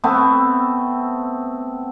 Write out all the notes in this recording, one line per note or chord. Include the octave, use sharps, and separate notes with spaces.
A3 B3 C4